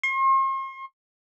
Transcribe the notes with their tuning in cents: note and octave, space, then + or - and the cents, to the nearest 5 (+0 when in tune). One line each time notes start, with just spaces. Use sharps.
C6 +45